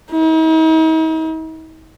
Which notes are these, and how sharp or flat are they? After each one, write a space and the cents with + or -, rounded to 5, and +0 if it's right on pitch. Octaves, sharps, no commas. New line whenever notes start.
D#4 +45